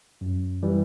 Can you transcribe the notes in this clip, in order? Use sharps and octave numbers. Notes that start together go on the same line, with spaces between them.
F#2
E3 G3